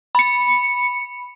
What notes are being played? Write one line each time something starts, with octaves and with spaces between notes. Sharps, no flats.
B5 C#7